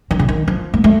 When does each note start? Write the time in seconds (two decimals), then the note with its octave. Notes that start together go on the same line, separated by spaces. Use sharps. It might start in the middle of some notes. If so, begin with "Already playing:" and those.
0.11 D#3
0.19 C#3
0.29 D#3
0.48 F3
0.74 A#3
0.84 A3